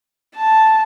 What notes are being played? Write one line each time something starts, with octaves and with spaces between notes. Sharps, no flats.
A5